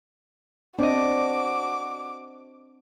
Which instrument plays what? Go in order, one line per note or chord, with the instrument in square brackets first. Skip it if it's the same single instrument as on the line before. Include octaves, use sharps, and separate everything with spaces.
[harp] C4 D5 D#5 [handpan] D4 [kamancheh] F#4 D6